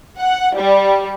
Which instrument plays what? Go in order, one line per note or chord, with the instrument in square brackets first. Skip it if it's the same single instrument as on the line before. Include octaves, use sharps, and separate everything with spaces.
[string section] F#5
G3